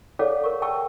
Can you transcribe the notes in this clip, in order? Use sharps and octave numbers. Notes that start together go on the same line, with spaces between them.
G#4 A4 C#5 D5 F5 F#5
A#4 C#6
F#5 G5 A5 C#6 E6